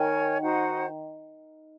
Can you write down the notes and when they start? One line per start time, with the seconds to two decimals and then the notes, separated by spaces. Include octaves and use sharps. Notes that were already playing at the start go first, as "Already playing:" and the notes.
Already playing: D#3 A#4 C#5 G#5
0.41 D#4 F#4 C5 F#5